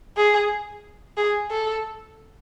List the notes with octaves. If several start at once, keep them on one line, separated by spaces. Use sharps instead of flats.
G#4
G#4
A4